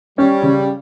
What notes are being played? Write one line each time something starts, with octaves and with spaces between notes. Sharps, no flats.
G3 C#4
C#3